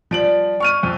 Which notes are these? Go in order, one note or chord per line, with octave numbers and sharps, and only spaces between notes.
F3 G3 D7 F#7
C#6 F6 D#7
F2